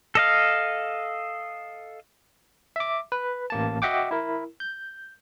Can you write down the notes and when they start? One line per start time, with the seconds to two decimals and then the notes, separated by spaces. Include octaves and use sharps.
0.15 A4 D#5 F5
2.76 E5 D6
3.12 B4
3.50 A1 A#3 A5
3.82 F#4 D#5 E5 F#5 G5 D6
4.11 E4 A#4
4.60 G6